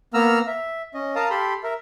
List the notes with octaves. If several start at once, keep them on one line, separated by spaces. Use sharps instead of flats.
A#3 B3 A#5 E6 F6
E5
C#4 D#5
A#4 F5 A5 A#5 D#6
G4 A4 B5 C6
A#4 E5